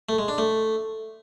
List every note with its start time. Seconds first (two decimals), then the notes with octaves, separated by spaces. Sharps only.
0.09 A3
0.18 G#3
0.28 D4
0.38 A3